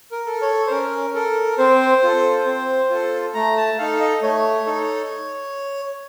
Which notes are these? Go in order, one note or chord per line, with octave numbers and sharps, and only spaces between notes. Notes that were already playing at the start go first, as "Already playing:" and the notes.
A#4
A4
C#5
C5
C#4 A#4
A4 A#4
C4 C5
F4 A4
C4
F4 A4
A3 A#5
A5
D#4 A4 F5
D#5
A3 C#5
D#4 A4